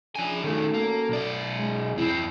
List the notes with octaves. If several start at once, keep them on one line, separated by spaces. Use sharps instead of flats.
F3 C#4 D4 G#4 G#5
D#3 A3 C#4 F#4 A4
A#3
B1 D5
G#3
E2 C4 E4